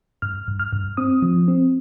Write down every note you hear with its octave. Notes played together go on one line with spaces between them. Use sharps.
G2 F6
G2
F6
G2
C4 D#6
F3
C4